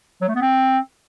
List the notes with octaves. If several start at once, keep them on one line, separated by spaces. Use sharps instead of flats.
F#3
A3
B3
C4